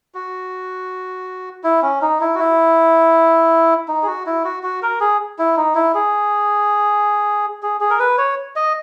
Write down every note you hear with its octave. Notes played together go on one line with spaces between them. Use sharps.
F#4
E4
C#4
D#4
E4
F#4
E4
D#4
G#4
F#4
E4
F#4
F#4
A#4
G#4
E4
D#4
E4
G#4
G#4
G#4
A#4
B4
C#5
D#5